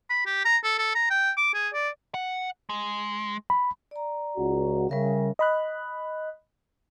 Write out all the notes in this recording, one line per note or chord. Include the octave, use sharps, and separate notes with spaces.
B5
G4
A#5
A4
A4
A#5
G5
D6
G#4
D5
F#5
G#3
B5
D5 A#5
C#2 F#4
C#3 G3 A#4 E5
D#5 B5 F#6